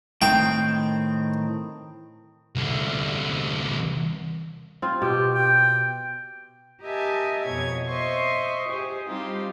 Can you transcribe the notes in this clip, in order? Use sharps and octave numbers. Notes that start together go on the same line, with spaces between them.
A2 D#3 C4 G5
C2 D3
C4 F4
B2 G4
G5
G4 A#4 D#5 E5 G#5 A5
F2 B2 C#5 G#6
C5 D#5 E5 C6 C#6
G4 G#4 C5
G3 C4 D#4 F4 G4